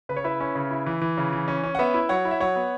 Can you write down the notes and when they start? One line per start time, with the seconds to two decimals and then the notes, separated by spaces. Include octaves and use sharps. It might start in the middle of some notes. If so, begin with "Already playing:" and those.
0.09 C#3 B4
0.17 C#5
0.24 E4 B4 E5
0.40 C#4
0.55 C#3
0.71 E4
0.86 E3
1.02 E3
1.18 C#3
1.33 E3
1.48 C#4
1.63 C#4
1.75 F#5
1.79 B3 B4 E5
1.94 E4
2.09 F#3 C#5 F#5
2.25 E4
2.31 E5
2.40 F#3 C#5 F#5
2.56 B3